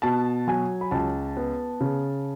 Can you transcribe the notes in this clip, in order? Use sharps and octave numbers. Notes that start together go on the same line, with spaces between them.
B2 A5
F#3 G#5
B5
C#2 A5
B3
C#3